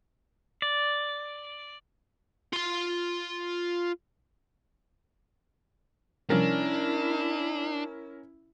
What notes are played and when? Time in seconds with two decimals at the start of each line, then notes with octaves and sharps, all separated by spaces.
0.62 D5
2.53 F4 C6
6.30 C3 F3 G3 C#4 D4 E4 A#4